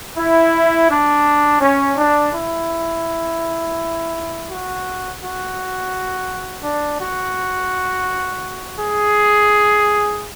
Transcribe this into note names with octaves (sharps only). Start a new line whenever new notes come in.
E4
D4
C#4
D4
E4
F#4
F#4
D4
F#4
G#4